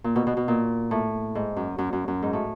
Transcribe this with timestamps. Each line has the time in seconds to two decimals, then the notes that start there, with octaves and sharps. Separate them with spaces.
0.04 A#2
0.16 B2
0.27 B2
0.37 B2
0.48 A#2
0.91 A2
1.35 G#2
1.56 F#2
1.78 F#2
1.93 F#2
2.08 F#2
2.22 G#2
2.33 A2